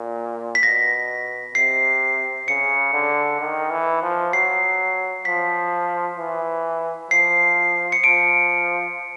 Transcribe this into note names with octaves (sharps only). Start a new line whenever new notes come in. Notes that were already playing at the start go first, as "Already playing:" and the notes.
Already playing: A#2
B6
B2 A#6
C3 C7
C#3 C#7
D3
D#3
E3
F3
F#3 C7
F3 B6
E3
F3 C7
C#7
F3 D7